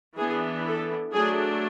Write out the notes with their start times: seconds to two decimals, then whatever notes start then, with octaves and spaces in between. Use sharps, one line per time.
0.17 E3 B3 D4 G#4
0.66 A4
1.14 F#3 A3 D4 G#4